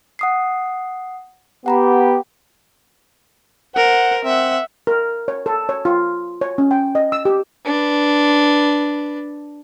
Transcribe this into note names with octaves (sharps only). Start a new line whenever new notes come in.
F#5 D#6 C7
B3 G4 F#5 A#5 B5
A#4 C5 F#5
C4 E5 F#5
A#4
C#5
A4
C#5
F4
C#5
C#4
G5
D#5
E6
G4
D4 B4